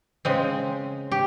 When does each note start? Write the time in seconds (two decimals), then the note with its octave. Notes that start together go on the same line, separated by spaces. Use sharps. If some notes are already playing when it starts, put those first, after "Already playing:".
0.25 C#3 G#3 C4
1.12 G4